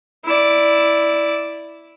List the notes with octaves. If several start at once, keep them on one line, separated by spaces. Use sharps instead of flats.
E4 D5